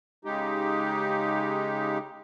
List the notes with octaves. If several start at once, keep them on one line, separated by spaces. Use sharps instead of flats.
C#3 G#3 D#4 G4